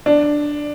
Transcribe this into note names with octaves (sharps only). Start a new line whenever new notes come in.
D4